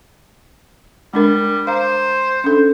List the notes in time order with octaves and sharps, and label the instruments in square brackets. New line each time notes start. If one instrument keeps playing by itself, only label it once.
[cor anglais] G3 [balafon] G#3 D4 A#4
[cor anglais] C5 [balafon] F5 A#5
[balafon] C#4 D4 A4